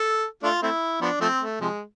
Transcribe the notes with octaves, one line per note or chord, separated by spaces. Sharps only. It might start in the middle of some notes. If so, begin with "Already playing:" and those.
Already playing: A4
A3 D4 F4
A3 C4 E4
F3 B3 D4
F3 A3 C4
A3
C3 F3 G#3